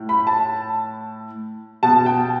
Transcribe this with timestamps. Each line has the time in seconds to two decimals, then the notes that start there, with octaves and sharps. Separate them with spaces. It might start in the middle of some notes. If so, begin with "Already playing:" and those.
Already playing: A2
0.09 B5
0.27 A5
1.83 B2 A5
2.06 G5